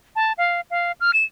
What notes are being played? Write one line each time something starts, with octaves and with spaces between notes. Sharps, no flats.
A5
F5
F5
F6
E7